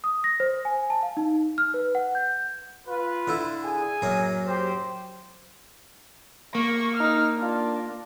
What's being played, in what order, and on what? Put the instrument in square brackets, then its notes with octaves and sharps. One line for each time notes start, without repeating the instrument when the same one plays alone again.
[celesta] D#6
A#6
C5
G#5
A5
F5
D#4
F6
B4
F#5
G6
[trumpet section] F4 B4
[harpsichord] D3 E4
[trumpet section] G#4 G#5
[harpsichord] F#2 F#3 A#3
[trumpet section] G4 C5
[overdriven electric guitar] A#3 [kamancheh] C#6
[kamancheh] D#4 F6
D4 F4